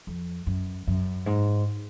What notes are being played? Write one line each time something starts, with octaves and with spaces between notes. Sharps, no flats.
F2
F#2
F#2
G#2